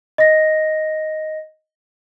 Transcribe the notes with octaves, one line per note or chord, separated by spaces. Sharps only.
D#5 A#6